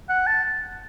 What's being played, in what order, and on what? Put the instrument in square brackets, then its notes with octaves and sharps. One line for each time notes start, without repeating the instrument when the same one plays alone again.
[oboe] F#5
A5